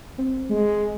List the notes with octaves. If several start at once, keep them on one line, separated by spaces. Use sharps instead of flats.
C4
G#3